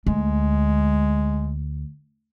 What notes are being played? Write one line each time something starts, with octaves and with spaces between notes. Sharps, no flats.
D2 G#3